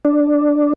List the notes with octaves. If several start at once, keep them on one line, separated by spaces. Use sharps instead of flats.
D4